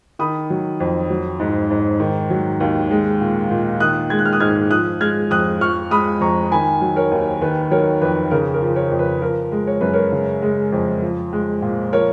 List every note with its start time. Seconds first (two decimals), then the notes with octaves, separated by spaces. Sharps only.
0.19 D#3 B5 D#6
0.50 F#3
0.80 F2
1.10 F#3
1.40 G#2
1.70 G#2
2.00 D#3
2.30 F#3
2.60 D#2
2.91 G#3
3.21 A#2
3.50 A#2
3.80 D#3 D#6 F#6
4.10 G#3 G#6
4.19 F#6
4.26 F6
4.33 D#6 F#6
4.40 G#2 F6 G#6
4.71 F3 D#6 F#6
5.00 G#3 F6 G#6
5.31 F2 D#6 F#6
5.60 F3 C#6 F6
5.90 G#3 B5 D#6
6.21 F2 A#5 C#6
6.51 D#3 G#5 B5
6.82 F#3
6.96 A#4 C#5
7.11 D#2
7.42 D#3 B4
7.71 F#3 A#4 C#5
8.01 F2 B4
8.31 C#3 A#4
8.54 A#4
8.62 F3
8.76 A#4 C#5
8.91 F2
8.99 B4
9.22 F3 A#4
9.52 G#3
9.67 C#5
9.81 F#2 B4
9.93 A#4 C#5
10.12 C#3
10.42 G#3
10.72 F2
11.02 F3
11.33 G#3
11.62 A#2
11.93 F3 A#4 C#5